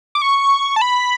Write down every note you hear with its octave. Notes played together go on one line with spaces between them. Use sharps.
D6
C#6
A5
B5